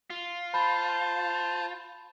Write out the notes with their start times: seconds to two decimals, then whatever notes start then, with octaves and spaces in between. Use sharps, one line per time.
0.10 F4
0.54 C5 A5 B5